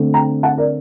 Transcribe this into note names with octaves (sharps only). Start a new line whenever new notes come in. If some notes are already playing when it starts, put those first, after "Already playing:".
Already playing: D3 A3 C4
G5 A#5
F#5 A5
A#4 D5